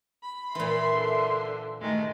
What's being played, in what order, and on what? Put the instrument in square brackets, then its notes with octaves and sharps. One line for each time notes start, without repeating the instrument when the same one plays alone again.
[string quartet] B5
[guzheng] A#2 E3 [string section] E5 C6
[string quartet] D3
[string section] D2 G2 [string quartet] D#3 G#3 A3